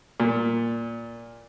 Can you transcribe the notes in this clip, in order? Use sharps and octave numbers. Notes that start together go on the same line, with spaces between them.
A#2